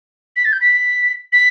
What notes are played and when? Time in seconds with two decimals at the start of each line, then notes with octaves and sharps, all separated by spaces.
0.36 B6
0.45 A6
0.52 G6
0.61 B6
1.32 B6